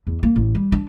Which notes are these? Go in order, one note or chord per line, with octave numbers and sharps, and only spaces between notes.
E2
A#3
A1
G3
D4